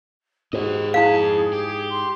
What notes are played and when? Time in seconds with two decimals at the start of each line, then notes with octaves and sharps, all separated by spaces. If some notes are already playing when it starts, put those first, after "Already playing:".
0.53 G#2 F#4 G4 D#5
0.94 F2 E4 G#4 F5 A5
1.53 G4
1.90 C6